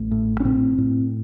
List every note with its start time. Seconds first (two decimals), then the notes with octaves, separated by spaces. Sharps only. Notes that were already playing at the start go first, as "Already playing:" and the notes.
Already playing: A1 A3
0.11 A2
0.40 C#4
0.45 A2 C4
0.78 A2